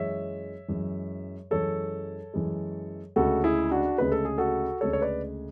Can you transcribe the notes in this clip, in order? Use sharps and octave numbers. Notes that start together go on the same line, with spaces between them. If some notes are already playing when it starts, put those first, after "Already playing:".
Already playing: F#2 E3 G#3 C#5 E5
F#2 E3 G#3
F#2 E3 G#3 A4 C#5
F#2 E3 G#3
D2 C#3 G#3 F#4 A4
E4 G#4
D4 F#4
D2 C#3 G#3 B4
A4
G#4
F#4 A4
D2 C#3 G#3 A4 C#5
C#5
B4 D5